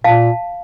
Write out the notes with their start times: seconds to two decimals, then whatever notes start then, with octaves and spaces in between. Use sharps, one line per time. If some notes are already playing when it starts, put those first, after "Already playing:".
0.04 A#2 F5 A5